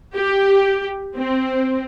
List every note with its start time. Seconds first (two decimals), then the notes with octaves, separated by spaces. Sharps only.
0.15 G4
1.15 C4